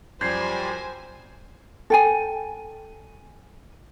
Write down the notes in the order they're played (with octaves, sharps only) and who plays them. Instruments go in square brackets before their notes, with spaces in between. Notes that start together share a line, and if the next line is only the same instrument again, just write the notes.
[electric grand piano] F#2 F3 [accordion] G3 [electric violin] C5 G#5 [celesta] G6 G#6 C7
[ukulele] A4 G5 G#5